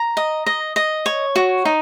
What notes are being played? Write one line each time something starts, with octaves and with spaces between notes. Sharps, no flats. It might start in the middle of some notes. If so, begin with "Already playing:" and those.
Already playing: A#5
D#5
D#5
D#5
C#5
F#4
D#4